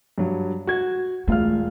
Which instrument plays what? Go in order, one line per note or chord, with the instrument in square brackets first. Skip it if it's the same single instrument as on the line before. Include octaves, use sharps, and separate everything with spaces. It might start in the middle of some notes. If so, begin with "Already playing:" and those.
[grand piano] G2 F#3
F#4 G#6
[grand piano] E1 F4 F6 [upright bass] A3